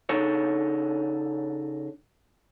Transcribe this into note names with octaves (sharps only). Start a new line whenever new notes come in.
C#3 D4 D#4 A4 C#5